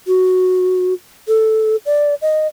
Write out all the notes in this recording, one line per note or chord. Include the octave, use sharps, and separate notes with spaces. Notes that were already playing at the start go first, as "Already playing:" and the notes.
F#4
A4
D5
D#5